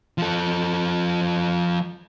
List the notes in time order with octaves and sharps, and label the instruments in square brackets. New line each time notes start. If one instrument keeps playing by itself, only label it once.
[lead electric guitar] F3 A4